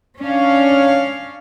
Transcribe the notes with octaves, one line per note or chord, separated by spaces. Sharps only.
C#4 D4 C#5 F5